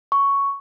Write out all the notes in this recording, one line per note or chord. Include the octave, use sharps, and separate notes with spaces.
C#6